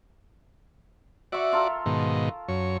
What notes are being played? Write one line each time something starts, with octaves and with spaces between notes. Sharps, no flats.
F#4 D5 E5 C#6
F4 A4 A#4
G#2 B2 D#3
F#2 C#5